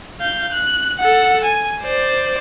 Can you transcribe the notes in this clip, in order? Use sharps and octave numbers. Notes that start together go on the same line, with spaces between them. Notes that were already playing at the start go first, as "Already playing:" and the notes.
F5 G6
F#6
A4 F#5
G#5
C5 D5